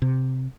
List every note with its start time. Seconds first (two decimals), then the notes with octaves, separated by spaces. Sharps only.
0.02 C3